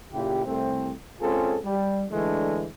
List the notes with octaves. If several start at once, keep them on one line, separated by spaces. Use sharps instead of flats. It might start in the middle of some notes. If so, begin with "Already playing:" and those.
A#2 C#3 E4 G4
C2 A3 C4
G#3 C4 C#4 F4 G#4 A4
G3
D3 E3 G#3 A3 D4